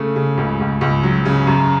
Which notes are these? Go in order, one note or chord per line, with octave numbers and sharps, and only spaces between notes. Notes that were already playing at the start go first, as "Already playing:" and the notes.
Already playing: C#3 A3
C#3
C#2
C#2
C#2
F#3
C#3
F#2